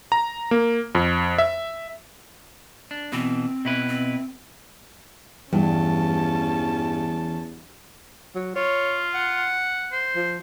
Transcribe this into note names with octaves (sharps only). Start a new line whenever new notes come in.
A#5
A#3
F2
E5
D4
B2 E3 C4
B2 E4 B4
C4
E2 G2 E3 C#4 A5
F#3
F4 C#5
F#5
C5
F3